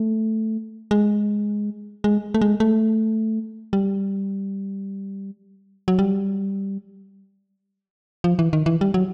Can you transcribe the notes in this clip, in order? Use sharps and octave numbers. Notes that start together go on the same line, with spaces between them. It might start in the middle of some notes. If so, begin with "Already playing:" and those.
Already playing: A3
G#3
G#3
A3
G#3
A3
G3
F#3
G3
F3
E3
D#3
E3
G3
F#3